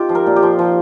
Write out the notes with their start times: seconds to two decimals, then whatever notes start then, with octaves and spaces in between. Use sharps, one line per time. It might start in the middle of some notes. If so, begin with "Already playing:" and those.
Already playing: C4 D#4 F4 G4
0.09 F3
0.15 A#4
0.26 A#2
0.36 G4
0.43 F3
0.59 F3